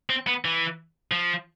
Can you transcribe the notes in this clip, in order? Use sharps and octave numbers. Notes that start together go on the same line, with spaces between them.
C4
B3
E3
F3